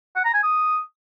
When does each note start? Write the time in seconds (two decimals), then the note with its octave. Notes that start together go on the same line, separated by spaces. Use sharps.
0.16 F#5
0.25 A#5
0.34 G#5
0.43 D#6